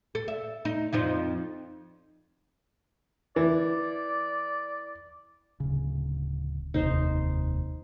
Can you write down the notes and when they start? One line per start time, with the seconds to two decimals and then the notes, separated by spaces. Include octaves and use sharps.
0.15 A4
0.28 E5
0.65 D#4
0.93 F2 F3 D#4
3.36 E3 D5
5.60 D1 C#3
6.74 F1 D#2 C3 D#4 C5